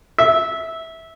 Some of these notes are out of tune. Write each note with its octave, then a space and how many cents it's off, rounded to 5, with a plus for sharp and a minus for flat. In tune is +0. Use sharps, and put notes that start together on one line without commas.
E5 -15